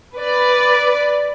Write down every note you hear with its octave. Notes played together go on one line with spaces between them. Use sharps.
B4 D5